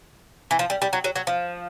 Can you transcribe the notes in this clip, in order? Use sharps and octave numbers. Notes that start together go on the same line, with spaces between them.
E3
F3
G3
G3
F#3
F#3
F#3
F3